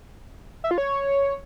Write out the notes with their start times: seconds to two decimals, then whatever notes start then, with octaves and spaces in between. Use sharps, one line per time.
0.64 E5
0.71 F4
0.78 C#5